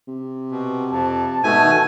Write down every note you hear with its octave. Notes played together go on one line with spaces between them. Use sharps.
C3
B2
F2 A5
G#2 B2 A3 G#5
D#3